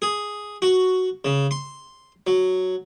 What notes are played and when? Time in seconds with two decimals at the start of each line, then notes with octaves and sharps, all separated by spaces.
0.02 G#4
0.62 F#4
1.25 C#3
1.51 C6
2.27 F#3